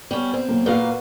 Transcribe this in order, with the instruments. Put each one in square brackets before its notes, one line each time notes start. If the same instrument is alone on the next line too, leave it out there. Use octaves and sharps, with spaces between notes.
[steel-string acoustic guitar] G3 C#4 [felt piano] B3
[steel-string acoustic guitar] C4
[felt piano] B2 F#3 A#3
[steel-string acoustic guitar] A#2 A#3 F5 [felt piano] F#4 B4 D5